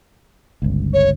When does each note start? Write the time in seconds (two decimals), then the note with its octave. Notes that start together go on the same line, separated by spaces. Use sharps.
0.62 G1 C#2
0.93 C#5